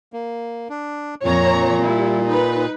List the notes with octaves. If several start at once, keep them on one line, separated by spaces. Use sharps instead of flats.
A#3
D4
F2 A#2 C#5 A#5
G3 E4
D#4 B4